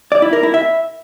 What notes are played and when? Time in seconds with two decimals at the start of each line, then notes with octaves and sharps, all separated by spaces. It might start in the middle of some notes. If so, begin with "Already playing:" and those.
0.12 D5
0.22 E4
0.33 A#4
0.43 E4
0.54 E5